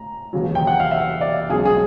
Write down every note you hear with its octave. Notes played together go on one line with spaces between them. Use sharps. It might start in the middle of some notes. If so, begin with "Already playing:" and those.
Already playing: A2 A#5
E1 D#2 C#3 F#3
G5
F#5
F5
E5
D5
B1 B2 G#3 C#4 G#4
G#4